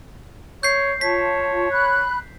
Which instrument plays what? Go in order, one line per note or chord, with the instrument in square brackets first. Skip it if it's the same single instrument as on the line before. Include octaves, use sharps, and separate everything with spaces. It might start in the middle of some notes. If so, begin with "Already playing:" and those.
[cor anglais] C#5 [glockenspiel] G6 C7
[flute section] F4 A5 [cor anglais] C#5 [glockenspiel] B6
[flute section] B5 F#6